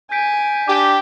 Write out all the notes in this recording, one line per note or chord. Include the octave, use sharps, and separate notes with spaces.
G#5 G6 B6 D7
D4 G4 D6